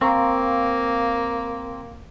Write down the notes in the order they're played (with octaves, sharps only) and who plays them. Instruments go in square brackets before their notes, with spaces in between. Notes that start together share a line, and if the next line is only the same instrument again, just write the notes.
[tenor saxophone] A#3 [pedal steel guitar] C4 [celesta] F5 A#5 C#6